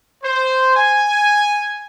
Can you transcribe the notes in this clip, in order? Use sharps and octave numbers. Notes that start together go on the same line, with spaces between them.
C5
G#5